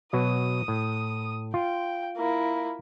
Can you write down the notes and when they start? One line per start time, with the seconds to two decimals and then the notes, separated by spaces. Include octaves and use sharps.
0.13 B2 F#3 D#6
0.68 A2
1.54 F4 G5
2.16 A#3 E4